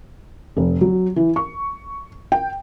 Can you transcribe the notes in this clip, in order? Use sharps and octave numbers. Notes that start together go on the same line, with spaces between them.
F1
F#3
E3
C#6
G5